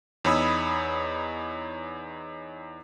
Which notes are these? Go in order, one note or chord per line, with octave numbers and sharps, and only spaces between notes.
E2 D#4 C#5 B5 D#6 E6